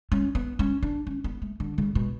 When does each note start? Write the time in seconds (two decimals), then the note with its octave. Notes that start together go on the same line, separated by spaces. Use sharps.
0.12 C#4
0.35 B3
0.59 C#4
0.83 D4
1.07 C#4
1.24 B3
1.42 A3
1.60 D3
1.78 C#3
1.95 B2